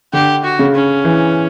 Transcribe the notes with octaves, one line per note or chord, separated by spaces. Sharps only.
D3 G4
F#4
C#3
C#4
E3